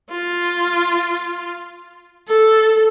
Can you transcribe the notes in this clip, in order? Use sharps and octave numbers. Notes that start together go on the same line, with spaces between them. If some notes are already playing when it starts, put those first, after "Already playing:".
F4
A4